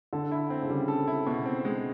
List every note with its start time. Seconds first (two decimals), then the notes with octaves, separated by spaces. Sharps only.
0.13 D3 A4
0.31 E4
0.50 C4
0.63 C#3
0.69 D3 G3
0.88 A4
1.07 E4
1.27 B2
1.46 C4
1.65 G#3